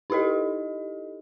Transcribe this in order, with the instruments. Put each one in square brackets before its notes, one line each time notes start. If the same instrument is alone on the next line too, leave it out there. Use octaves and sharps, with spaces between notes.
[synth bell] D#4 E4 G4 A4 D#5